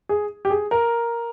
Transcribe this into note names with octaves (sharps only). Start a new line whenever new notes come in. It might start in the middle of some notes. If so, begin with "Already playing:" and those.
G#4
G4
G#4
A#4